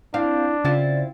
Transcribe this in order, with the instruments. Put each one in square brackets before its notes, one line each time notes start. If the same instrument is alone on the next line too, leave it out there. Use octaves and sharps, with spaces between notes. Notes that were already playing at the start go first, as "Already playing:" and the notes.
[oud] C4 F5 [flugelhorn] D4 [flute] E4
[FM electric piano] C#3 A6 [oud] C4 E4 F4 [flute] D5